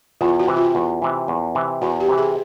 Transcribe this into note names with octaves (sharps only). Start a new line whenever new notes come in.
E2 F4
F#4
C3 E3
F4
E2
C3 E3
E2
C3 E3
E2 F#4
G4
C3 E3
G#4